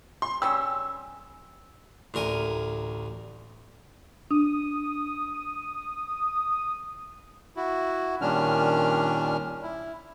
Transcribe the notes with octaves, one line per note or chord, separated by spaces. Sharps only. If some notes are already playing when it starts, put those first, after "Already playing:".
C6
G3 C#4 G#4 E6
A1 D2 A#4 G#5
D4 D#6
E4 F#4
A#2 D#3 G3 C#4 D4 F6
E4